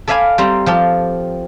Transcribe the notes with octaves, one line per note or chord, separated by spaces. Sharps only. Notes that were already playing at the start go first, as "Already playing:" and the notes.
A4 D5 E5 F5 G#5 B5
G3 C4 C5 A#5
F3 G4 A4